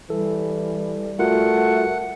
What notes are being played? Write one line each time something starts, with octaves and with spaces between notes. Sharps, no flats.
E3 G3 A4
A3 F4 F#4 A#4 F#5